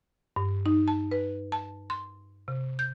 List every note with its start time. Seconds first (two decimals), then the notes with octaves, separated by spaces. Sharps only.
0.36 G2
0.66 D#4
0.88 A5
1.11 B4
1.52 A5
1.90 C6
2.48 C3
2.79 G6